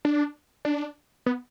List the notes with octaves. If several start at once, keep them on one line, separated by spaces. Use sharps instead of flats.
D4
D4
B3